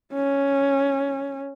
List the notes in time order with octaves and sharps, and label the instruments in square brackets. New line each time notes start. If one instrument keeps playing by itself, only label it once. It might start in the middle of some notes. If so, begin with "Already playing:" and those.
[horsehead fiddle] C#4